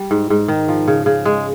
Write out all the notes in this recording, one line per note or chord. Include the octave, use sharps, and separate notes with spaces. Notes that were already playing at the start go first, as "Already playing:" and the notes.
Already playing: G3
G#2
G#2
D#3
F3
C#3
C#3
G#3